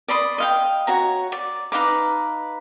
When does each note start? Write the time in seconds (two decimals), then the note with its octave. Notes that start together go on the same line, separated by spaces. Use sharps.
0.08 D5 B5 C6 D#6
0.38 D#5 F5 G5
0.87 F#4 C#5 A#5
1.32 D5
1.72 D#4 B4 F5 D6